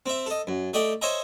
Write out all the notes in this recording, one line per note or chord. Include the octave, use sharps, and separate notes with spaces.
C4 E5
A4 D#5
F#2
A3 D5 D#5 G5
C5 C#5 D#5 E5 G#5 A#5